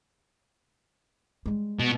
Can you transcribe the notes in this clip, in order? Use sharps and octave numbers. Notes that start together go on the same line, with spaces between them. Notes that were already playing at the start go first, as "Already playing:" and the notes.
G3 G#3
B2